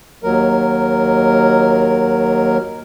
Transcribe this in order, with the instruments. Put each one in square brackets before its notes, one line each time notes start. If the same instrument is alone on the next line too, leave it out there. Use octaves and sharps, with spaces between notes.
[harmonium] D#2 F#3 A#4